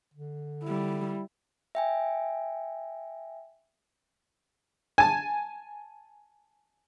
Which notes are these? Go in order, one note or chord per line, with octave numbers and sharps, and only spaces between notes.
D3
G3 E4
E5 G5 G#5
G#5 A5